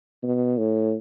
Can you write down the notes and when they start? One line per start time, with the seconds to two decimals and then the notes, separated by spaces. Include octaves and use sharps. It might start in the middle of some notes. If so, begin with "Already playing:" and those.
0.23 B2
0.58 A2